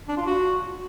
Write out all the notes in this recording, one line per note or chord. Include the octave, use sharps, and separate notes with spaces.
D4
F4
F#4